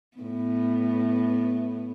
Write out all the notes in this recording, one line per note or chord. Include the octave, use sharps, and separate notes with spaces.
A2 B3